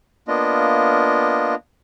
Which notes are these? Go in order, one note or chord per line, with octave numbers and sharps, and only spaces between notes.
A#3 B3 D4 F4 D#5